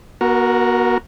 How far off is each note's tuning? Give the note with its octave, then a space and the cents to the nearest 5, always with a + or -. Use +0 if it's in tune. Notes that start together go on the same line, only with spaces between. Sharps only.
B3 -40 F#4 +0 A#4 +0